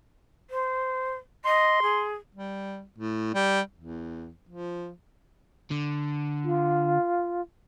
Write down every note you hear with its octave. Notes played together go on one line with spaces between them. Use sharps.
C5
D#5 C6
G#4
G3
A2
G3
E2
F3
D3
F4